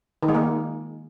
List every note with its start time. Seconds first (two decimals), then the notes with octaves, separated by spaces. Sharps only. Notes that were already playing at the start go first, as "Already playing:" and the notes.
0.23 D#3
0.29 G#3
0.34 A#3